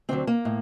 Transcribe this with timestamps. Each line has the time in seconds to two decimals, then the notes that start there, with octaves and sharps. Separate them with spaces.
0.09 D2 D3 F#3 C4
0.27 A#3
0.45 A2